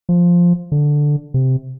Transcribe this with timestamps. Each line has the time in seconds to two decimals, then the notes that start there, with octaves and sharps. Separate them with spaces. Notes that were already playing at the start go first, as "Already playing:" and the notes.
0.09 F3
0.72 D3
1.34 C3